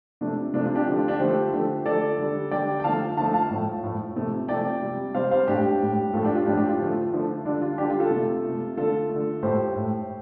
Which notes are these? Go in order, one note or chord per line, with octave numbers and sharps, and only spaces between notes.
C3 F3 A3 D4
C3 F3 A3 D4
F4
D4 G4
D3 F3 A3
F4
D4 G4
D3 F3 A3 G4 C5
D3 F3 A3
D3 F3 A3 A4 D5
D3 G3
D3 G3 D5 G5
G5
D3 F3 A3 F5 A5
D3 F3 A3 F5 A5
F5 A5
A2 F3 A3
A2 F3 A3
C3 F3 A3
C3 F3 A3 D5 G5
C3 G3
C3 G3 C5 F5
C5 F5
A2 G3 D4 G4
A2 G3
A2 F3 A3 F4 A4
D4 G4
F4
A2 F3 A3 D4 G4
D4 G4
F4
D3 F3 A3
D3 F3 A3
D3 G3 D4
F4
D3 G3 D4 G4
F4
F4 A4
C3
A3
C3 A3
D3 A3 F4 A4
A3
D3
A2 A3 G4 C5
A2 A3